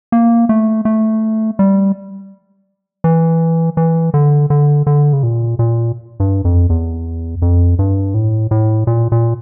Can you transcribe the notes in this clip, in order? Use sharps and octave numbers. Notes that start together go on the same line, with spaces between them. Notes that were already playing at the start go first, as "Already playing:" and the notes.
A#3
A3
A3
G3
E3
E3
D3
D3
D3
C#3
A#2
A#2
G2
F2
E2
F2
G2
A2
A2
A#2
A#2